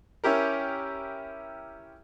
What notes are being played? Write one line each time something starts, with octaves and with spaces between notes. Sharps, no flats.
C#4 E4 G4 A#4